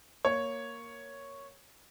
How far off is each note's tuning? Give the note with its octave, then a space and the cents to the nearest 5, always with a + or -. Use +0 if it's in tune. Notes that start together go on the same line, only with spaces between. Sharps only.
A#3 +0 C#5 +0